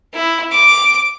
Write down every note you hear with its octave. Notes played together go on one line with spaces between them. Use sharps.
E4
D6